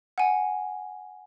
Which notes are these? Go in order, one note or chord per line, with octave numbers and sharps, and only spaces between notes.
F#5 G#5